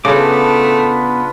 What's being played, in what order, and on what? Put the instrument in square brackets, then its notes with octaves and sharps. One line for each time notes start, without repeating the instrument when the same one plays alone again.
[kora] C#3 [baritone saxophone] A3 [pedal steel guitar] B3 D6 [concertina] D4 F4 B4